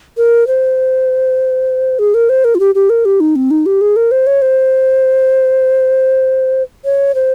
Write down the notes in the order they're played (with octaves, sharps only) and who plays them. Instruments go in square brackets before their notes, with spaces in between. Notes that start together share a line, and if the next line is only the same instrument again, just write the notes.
[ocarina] A#4
C5
G#4
A#4
C5
A#4
F4
G4
G4
A#4
G4
D#4
C4
D#4
G4
G#4
A#4
C5
C#5
C5
C#5
C5